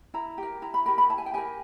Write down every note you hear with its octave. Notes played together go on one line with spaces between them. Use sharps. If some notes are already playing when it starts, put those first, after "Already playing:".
E4 A#5
G4 A#4
E4 A#5
B5
G4 A#4 B5
B5
E4 A5
G#5
G5
G4 A#4 G#5